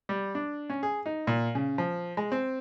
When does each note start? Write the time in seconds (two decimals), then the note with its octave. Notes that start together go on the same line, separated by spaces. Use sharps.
0.09 G3
0.35 D4
0.70 C#4
0.83 G#4
1.06 D#4
1.27 A#2
1.55 C#3
1.78 F3
2.17 G#3
2.32 C4